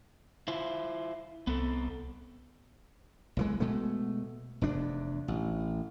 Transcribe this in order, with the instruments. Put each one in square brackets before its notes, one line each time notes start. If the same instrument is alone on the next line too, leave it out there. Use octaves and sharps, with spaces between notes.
[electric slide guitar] E4 F4 C5
[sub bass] C2 [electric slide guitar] B3 C4 A4
[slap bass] B1 E3 G#3
B2 G#3 A3
F1 E2 D4
A1